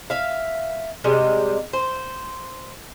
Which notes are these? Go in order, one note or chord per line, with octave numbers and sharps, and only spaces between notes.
E5 F5
C3 G3 G#3
C5